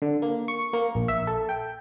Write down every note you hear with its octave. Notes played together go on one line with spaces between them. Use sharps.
D3
A#3
C#6
A#3
A#1
E5
A4
G5